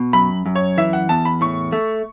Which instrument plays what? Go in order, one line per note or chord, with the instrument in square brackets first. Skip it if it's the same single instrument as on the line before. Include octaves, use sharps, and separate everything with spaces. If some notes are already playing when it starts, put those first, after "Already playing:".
Already playing: [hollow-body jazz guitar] B2
[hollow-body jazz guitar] F#2 [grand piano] B5
[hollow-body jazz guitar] F#2
[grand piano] C#5
[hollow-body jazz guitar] E3 [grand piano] E5
[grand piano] F#5
[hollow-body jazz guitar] E2 [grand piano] A5
[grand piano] B5
[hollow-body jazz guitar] A2 [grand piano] C#6
[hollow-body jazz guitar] A3